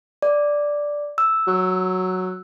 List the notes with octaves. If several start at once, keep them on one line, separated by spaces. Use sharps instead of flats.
D5
E6
F#3